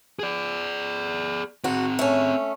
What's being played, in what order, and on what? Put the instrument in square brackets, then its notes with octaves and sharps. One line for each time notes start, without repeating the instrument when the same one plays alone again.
[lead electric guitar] G#4 D5
[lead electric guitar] C4 G#4 [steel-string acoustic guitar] F#4
[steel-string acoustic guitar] A3 C#4